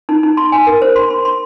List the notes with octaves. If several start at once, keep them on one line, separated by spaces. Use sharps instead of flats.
D#4
D#4
C6
G#5
A#4
C5
C6
C6
C6